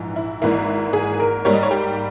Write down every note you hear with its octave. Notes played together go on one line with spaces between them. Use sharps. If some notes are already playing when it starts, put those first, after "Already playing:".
Already playing: A#1 G#2 E3
E4
G#1 G#2 E3 A#3 E4
G#4
A#4
G#2 G3 A#3 C#5
D#5
C#5
G4